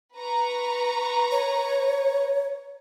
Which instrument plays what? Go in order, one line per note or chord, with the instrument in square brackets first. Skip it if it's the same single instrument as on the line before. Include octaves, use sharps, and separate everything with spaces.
[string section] B4 A#5 C#6
[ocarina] C#5